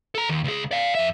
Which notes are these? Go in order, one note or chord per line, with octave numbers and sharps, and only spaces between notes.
A4 A#5
D#2
C#2 G#4
D5 F5
F2 E5